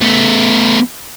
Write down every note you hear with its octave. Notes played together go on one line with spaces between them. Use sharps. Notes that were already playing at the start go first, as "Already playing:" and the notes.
A3 B3